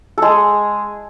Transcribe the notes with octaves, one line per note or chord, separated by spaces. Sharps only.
G#3 G#4 A4